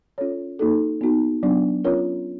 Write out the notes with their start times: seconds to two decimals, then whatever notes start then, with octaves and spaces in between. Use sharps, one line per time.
0.18 C#4 F4 A4 C#5
0.59 A#3 D#4 F#4 A4
1.01 B3 D#4 F#4
1.43 F#3 B3 D4
1.84 C#4 F4 A#4 C#5